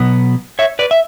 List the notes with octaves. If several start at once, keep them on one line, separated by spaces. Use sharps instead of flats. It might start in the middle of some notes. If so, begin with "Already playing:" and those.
Already playing: B2 F#3 B3
C#5 E5
B4 D5
E5